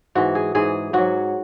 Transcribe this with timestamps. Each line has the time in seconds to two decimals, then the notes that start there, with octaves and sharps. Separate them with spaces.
0.15 G#2 E3 F#4
0.35 G#4
0.55 G#2 E3 G#4
0.93 G#2 F#3 F#4